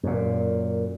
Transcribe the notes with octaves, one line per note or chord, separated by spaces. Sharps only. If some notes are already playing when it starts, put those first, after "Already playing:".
F#2 A#2